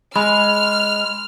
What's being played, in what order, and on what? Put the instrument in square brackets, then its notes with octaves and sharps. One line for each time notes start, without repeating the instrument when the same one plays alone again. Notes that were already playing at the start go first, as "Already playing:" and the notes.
[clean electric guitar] G#3 [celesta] B5 [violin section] F6